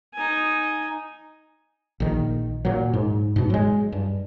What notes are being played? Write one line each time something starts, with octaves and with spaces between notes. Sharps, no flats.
D#4 G#5
A#1 D#3
A#2 F#3
G#2
G#2 B2
F#3 G#3
G2